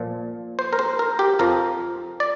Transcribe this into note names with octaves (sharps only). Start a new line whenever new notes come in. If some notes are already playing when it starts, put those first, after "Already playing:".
Already playing: A#2 F3
C5
A#4
C5
A#4
G4
F2 F3 A#4
D5